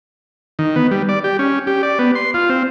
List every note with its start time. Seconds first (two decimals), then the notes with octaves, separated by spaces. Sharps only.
0.59 D#3
0.76 B3
0.91 G3
1.09 D5
1.24 G4
1.39 C#4
1.67 G4
1.83 D5
1.99 B3
2.15 C6
2.34 F4
2.49 C4